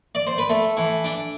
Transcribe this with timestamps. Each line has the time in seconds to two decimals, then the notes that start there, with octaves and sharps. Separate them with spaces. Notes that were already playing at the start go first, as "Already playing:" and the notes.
0.15 D5
0.27 C5
0.38 B4
0.49 A3 A4
0.77 E3
1.04 D4